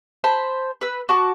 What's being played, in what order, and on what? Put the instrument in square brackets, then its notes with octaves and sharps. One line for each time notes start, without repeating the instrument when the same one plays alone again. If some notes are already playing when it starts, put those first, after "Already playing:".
[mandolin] C5 A5 B5
B4 E6
F#4 A5 D6